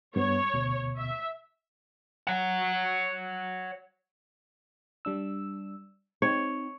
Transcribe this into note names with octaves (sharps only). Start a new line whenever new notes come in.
G2 B3 C#5
D2 B2
E5
C#5 F#5
G3 D4 E6
C4 D#4 C#5